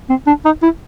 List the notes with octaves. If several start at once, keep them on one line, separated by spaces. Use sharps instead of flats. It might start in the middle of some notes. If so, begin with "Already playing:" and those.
C4
D4
D#4
E4